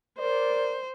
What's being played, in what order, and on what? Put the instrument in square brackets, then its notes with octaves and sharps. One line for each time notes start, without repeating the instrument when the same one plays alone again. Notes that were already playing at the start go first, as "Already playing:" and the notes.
[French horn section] A#4 D5 [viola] C5